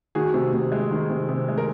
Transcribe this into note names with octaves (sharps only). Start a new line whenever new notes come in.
D#3 F#4 G#4
C3
C3
G#3
D#3
C3
C3
G#3
A#4